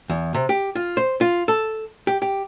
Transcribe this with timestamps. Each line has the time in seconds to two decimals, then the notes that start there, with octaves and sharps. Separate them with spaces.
0.10 E2
0.34 C3
0.49 G4
0.75 F4
0.97 C5
1.21 F4
1.48 A4
2.07 G4
2.22 G4